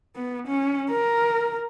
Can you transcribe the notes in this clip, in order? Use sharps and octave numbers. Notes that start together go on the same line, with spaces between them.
B3
C#4
A#4